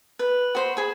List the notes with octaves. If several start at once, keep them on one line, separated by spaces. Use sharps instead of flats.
B4
F#4 C5 B5
G#4 B5